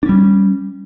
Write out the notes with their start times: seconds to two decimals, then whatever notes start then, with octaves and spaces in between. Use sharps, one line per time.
0.03 D4
0.06 C#4
0.09 G3